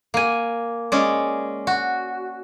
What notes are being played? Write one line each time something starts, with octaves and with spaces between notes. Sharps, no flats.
A#3 G#5
G#3 C#4 D5
F#4